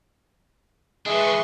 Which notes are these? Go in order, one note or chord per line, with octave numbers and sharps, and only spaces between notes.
E3 G#3 D4 B4 D#5 E5 C6 C#6